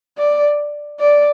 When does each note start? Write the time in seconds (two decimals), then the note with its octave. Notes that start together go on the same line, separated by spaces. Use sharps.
0.18 D5
1.00 D5